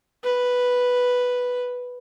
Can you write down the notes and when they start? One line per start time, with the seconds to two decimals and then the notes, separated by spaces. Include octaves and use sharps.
0.23 B4